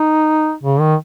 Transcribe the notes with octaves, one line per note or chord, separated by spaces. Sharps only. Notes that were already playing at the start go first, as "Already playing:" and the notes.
Already playing: D#4
C#3
D#3